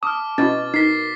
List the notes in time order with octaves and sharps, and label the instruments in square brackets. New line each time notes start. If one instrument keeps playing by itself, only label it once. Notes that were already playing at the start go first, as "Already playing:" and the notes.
[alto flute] A5 [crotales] D6 F6 [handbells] D#6
[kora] B2 [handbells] C#4 E4 F#4 [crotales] A6
[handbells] D#4 [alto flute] A#4 [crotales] B6 C7